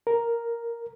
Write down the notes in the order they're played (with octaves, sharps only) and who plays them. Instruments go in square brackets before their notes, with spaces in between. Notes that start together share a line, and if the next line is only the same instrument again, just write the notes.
[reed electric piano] A#4